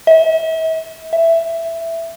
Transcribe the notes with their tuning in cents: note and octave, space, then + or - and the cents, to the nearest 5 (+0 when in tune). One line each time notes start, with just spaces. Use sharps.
E5 -40
E5 +10